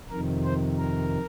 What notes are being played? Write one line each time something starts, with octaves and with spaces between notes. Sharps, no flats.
F2 C3 D#3 A#4
C5
A#4